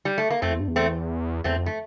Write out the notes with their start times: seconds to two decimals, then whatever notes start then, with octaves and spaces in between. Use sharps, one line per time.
0.05 G3
0.18 A3
0.30 A#3
0.42 F2 A3 C4
0.52 E2
0.60 G2
0.68 E2
0.76 A3 C4
1.44 E2 A3 C4
1.56 F2
1.66 A3